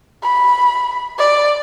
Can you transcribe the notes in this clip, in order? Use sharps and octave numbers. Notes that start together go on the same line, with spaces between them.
B5
D5